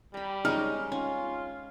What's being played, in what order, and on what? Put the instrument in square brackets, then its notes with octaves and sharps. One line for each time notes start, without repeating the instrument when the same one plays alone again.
[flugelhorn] G3 [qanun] A#5 B5
[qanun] G#3 C#4 [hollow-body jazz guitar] D#4 [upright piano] F6
[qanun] C#4 [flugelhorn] F4